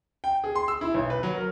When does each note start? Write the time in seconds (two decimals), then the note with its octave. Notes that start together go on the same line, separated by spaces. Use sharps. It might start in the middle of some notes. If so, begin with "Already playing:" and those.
0.24 G5
0.44 G#4
0.56 C6
0.68 E6
0.81 E4
0.94 B1
1.10 B4
1.23 F#3
1.37 A#4